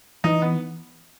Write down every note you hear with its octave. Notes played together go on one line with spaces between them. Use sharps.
E3 D#4
B3